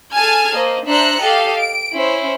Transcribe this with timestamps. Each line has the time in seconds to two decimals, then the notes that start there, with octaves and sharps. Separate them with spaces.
0.13 G#4 A4 G#5 A5 F6 G#6
0.55 A#3 C5 D#5
0.87 D4 C5 E5 A#5 F#6 C#7
1.20 G4 A4 D#5 F5
1.58 D7
1.93 C#4 E4 C5